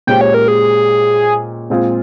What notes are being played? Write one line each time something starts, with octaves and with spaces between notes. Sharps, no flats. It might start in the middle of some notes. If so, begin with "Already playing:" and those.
A#2 G#3 C#4 G4 C5 G5
C#5
A#4
G#4
A#2 G#3 C4 F4 G#4